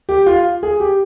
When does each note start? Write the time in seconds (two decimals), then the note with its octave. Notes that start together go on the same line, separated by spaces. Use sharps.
0.09 G4
0.26 F4
0.63 G#4
0.80 G4